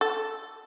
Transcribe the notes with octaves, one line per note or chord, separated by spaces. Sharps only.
A4